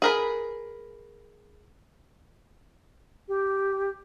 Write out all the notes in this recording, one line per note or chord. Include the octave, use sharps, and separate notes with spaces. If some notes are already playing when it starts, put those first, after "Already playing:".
G#4 A#4 B4
G4